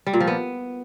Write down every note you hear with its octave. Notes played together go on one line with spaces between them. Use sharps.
G3
A#2
F3
B3